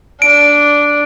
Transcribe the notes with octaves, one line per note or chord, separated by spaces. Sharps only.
D4 D7